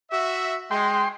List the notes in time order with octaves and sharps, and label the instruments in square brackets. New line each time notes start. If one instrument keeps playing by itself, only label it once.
[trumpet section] F#4 E5
[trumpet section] G#3 [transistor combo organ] G5 C6